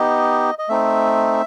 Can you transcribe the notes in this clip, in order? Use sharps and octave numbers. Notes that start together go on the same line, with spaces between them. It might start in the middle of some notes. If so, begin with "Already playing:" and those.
Already playing: B3 D#4 G4 D#5
D#5
A3 C4 D#4 E5